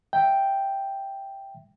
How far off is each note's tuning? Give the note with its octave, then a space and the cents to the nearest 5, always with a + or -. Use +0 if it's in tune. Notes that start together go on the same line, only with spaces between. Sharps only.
E5 +5 G5 +0